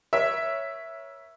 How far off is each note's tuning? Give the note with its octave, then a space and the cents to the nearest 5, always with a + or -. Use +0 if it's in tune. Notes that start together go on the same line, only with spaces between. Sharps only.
A#4 +45 C#5 +0 E5 +5